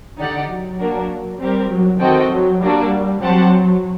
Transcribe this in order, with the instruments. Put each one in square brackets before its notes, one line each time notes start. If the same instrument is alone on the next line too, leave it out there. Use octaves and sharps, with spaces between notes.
[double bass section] D3 [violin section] D#4 G4 D5 F#5
[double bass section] F#3
[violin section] A#3 D4 F#4 A#4
[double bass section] G3 [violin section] C4 G4 A#4
[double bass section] F#3
[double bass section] D#3 [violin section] C4 F#4 A4 D#5 G5
[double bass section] F#3
[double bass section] G3 [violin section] A#3 D4 F#4
[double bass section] F#3 [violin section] C4 G4 C5 F#5 A5